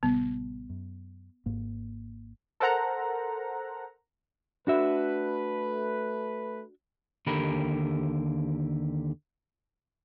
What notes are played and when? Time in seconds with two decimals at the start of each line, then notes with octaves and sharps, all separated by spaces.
0.03 A1 C3 G3 B3
0.69 F#2
1.46 G#1 G#2 A#3
2.60 A4 A#4 C5 F#5 A#5
4.67 A3 D4 F#4 B4 E5
7.27 D#2 D3 G4 A#4 B5